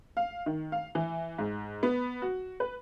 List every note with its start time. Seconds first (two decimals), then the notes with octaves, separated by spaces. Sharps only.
0.17 F5
0.46 D#3
0.72 F5
0.95 E3
1.38 G#2
1.83 B3
2.22 F#4
2.60 B4